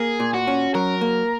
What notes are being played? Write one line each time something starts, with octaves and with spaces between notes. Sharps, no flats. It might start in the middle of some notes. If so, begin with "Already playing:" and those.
Already playing: A#3 G#4
A#2
F#4
C#4
F#3 A#4
A#3